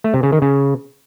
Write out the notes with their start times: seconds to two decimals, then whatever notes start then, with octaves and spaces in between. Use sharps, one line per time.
0.04 A3
0.14 C3
0.23 C#3
0.32 D#3
0.42 C#3